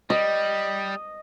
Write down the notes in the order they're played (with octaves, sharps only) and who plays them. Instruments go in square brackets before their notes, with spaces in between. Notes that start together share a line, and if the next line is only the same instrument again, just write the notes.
[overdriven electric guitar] G3 [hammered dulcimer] D#5